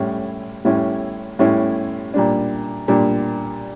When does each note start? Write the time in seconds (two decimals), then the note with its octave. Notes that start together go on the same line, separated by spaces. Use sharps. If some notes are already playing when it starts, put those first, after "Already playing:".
Already playing: A2 G3 C#4 E4
0.65 A2 G3 C#4 E4
1.39 A2 G3 C#4 E4
2.14 A#2 G3 D4
2.88 A#2 G3 D4